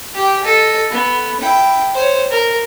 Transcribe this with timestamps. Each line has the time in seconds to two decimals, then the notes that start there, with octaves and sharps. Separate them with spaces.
0.15 G4 G5
0.44 A4 D#5
0.91 B3
1.40 E4 G5
1.94 C5 C#5
2.31 A#4